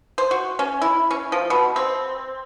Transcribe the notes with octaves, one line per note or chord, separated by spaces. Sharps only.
C5
F#4
C#4
E4
C#4
F3
B2
C4